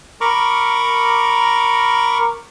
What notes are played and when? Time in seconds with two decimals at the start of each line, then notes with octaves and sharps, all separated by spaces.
0.21 A#4 A#5 B5 C#6 D6